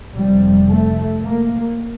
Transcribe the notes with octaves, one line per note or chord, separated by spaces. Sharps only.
F1 F2 C3 G3
A3
A#3